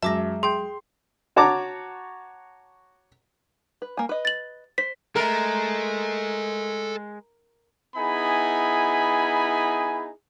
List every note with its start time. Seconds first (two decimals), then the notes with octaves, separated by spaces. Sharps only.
0.02 F#2 F#3 G#3 E5 A5 D6 A#6
0.43 G#4 G5 C6 G6
1.36 F#4 C#5 A5 A#5 D6
3.82 B4
3.97 A#3 G#5
4.09 B4 D#5
4.25 A6 F#7
4.78 C5 B6
5.16 G#3 A4 A#4 E5
7.96 B3 D#4 E4 G#4 G#5 B5